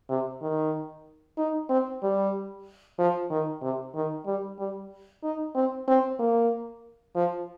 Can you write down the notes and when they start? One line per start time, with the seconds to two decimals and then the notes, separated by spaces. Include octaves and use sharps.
0.09 C3
0.42 D#3
1.38 D#4
1.70 C4
2.03 G3
2.99 F3
3.31 D#3
3.62 C3
3.95 D#3
4.26 G3
4.59 G3
5.24 D#4
5.55 C4
5.88 C4
6.19 A#3
7.16 F3